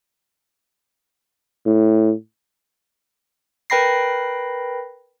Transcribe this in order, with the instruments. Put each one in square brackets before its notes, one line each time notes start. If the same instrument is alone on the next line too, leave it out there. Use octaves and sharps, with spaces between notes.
[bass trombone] A2
[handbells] A#4 B4 G5 B5 A#6 C7